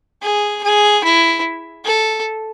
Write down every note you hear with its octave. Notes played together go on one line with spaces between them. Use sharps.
G#4
G#4
E4
A4